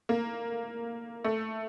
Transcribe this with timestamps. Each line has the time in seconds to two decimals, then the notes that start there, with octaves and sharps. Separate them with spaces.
0.09 A#3
1.24 A3